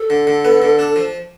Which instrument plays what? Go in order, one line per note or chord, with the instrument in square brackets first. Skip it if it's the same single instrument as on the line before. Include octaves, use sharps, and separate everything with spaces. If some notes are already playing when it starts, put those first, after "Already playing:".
Already playing: [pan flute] A4
[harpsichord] D3
D3
B3
D3
D4
F3